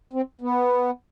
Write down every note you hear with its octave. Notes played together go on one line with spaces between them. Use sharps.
C4
B3